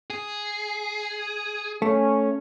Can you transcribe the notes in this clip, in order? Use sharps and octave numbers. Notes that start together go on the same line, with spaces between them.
G#4
A3 C#4